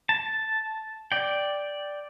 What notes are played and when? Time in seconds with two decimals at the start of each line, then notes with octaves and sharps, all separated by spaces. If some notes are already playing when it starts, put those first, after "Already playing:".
0.09 A5
1.12 D5 G5